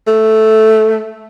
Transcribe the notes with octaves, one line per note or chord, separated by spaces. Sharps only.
A3